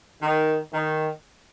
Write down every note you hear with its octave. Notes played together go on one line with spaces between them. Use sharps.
D#3
D#3